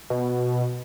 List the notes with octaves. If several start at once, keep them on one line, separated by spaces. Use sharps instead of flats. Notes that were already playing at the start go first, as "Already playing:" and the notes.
B2